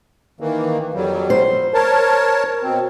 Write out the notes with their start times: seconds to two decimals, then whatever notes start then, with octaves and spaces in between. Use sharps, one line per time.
0.41 D#3 E3 A#3
0.94 F2 F#3 G3
1.30 C5
1.74 A#4 C#5 A5
2.63 B2 C4